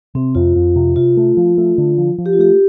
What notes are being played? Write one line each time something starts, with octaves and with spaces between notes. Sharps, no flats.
C3 C4
F2 F4
F2
C3
C3 F4
A3
F3
A3
D3
F3
F3
G4
F4
A3 G4